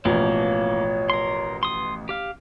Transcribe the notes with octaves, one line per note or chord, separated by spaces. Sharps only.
A1 B2 E3 F3 A#3 C#5
A#4 C6
C6 D#6
G4 F5